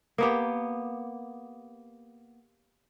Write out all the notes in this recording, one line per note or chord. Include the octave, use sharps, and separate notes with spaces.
A#3 B3 G4